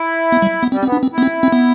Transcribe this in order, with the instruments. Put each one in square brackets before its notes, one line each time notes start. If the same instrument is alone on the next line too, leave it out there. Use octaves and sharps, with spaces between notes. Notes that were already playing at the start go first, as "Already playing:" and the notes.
Already playing: [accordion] E4
[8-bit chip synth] B3
G3
B3
[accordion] G3 [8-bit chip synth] C4
[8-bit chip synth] C4
[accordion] B3
[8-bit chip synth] D4
C4
[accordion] E4
[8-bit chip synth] B3
C4
C4
B3